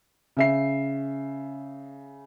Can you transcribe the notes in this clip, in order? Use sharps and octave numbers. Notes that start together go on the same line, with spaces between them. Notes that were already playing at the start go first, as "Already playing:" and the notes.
C#3 E5 C7